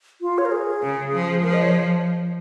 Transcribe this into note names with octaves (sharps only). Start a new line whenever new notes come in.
F4
C#5
A#4
G#4
C#3
F3
F3 A#4
D#5
C#5